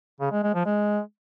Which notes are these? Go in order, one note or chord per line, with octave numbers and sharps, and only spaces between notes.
C#3
G#3
G#3
F3
G#3